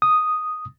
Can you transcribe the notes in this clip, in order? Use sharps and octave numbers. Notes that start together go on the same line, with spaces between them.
D#6